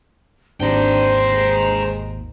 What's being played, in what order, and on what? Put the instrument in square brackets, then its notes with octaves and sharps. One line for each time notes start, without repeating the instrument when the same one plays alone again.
[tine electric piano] G#1 D#2 [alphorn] D4 [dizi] C5 [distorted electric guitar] G5 A#5
[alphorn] G#3